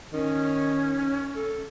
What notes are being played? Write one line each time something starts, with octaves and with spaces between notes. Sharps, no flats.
D#3 C#4
A4